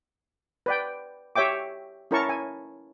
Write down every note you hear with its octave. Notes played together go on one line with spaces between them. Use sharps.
B4 D5 G5
G4 C#5 E5 G5 D6
C#4 E4 A#4 C#5 A5 C#6
G#5